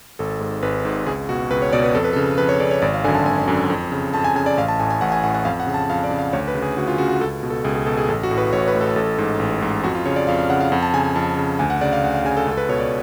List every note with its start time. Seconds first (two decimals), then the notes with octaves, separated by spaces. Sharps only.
0.19 G#1 A4
0.40 G#2
0.62 G#1 B4
0.85 G#2
1.07 C#2 G#4
1.29 B2 F#4
1.50 C#2 B4
1.62 C#5
1.73 B2 D5
1.84 B4
1.95 F2 A4
2.04 B4
2.13 A4
2.16 C#3
2.38 F2 B4
2.49 C#5
2.60 C#3 D5
2.71 C#5
2.82 G#1 D5
2.94 F5
3.04 D3 G#5
3.08 F#2
3.15 A5
3.26 G#1 G#5
3.48 F#2 D3
3.70 F2
3.92 C#3
4.14 F2 A5
4.24 G#5
4.36 C#3 G#5
4.46 D5
4.57 A1 F5
4.68 A5
4.80 A2 G#5
4.91 G#5
5.01 A1 F#5
5.12 G#5
5.24 A2 F#5
5.34 F#5
5.45 F2 F5
5.60 F#5
5.67 C#3
5.74 A5
5.90 F2 F5
6.04 D5
6.11 C#3
6.19 F5
6.33 D2 C#5
6.48 B4
6.55 C#3
6.62 G#4
6.76 D2 F#4
6.87 F4
6.98 C#3 F#4
7.09 F#4
7.21 C#2 A4
7.43 B2
7.50 A4
7.64 C#2 G#4
7.76 G#4
7.86 B2 A4
7.97 G#4
8.08 A1 A4
8.23 F#4
8.31 A2
8.38 B4
8.53 A1 C#5
8.68 B4
8.75 A2
8.81 A4
8.96 A1 A4
9.18 G#2
9.39 A1
9.62 G#2
9.83 F2 F#4
9.95 F4
10.06 C#3 C#5
10.16 D5
10.27 F2 F5
10.39 F5
10.49 C#3 F#5
10.61 F5
10.72 F2 F#5
10.83 A5
10.94 C#3 G#5
11.04 G#5
11.15 F2 A5
11.37 C#3
11.59 D2 G#5
11.70 F#5
11.81 C#3 D5
11.93 F5
12.03 D2 F#5
12.14 F5
12.25 C#3 G#5
12.37 A4
12.47 C#2 A4
12.58 B4
12.69 B2 C#5
12.79 D5